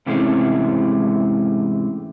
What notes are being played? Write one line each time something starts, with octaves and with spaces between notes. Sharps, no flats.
G#2 C3 E3 G#3 A3 C#4